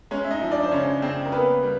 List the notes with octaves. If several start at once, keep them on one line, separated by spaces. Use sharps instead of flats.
G#3 C#4 C#5
E5
D#4 D#5
F3
D4 D5
C5
C#3 C#4 C#5
C#3 C4 C5
A#4
A#3 B3 B4
G3